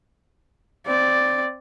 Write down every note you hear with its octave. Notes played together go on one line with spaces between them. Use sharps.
C4 D5